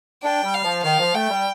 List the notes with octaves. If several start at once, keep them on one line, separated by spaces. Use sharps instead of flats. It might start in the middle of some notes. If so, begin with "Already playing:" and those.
D4 G5
G3
F5
F3
D#3 F5
F3
A3 G5
G3